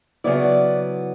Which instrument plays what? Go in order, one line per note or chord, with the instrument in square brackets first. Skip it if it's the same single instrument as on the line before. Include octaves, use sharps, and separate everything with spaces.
[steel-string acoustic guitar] C#3 F#3 B3 E4 D5